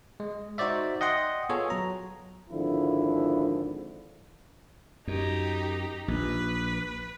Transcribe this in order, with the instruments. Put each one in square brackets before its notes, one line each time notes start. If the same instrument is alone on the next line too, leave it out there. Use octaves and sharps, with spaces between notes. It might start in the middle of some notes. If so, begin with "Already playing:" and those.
[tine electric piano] G#3
D#4 F#4 C5 D5 E5
D#5 F#5 G5 C6
B3 F4 G#4 A4 C#5
F#3 A#5
[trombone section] G#1 D3 F3 E4
[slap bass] F#2 [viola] D#4 G4
[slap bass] A#1 [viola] B4